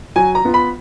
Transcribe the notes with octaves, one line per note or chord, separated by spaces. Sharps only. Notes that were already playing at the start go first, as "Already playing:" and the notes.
F#3 G#5
A#5
B3 F4
B5